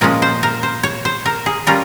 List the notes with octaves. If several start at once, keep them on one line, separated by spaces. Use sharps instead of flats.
A#2 F3 G#3 C#4 A#4
C5
A#4
C5
C#5
C5
A#4
G#4
G3 C#4 F4 A#4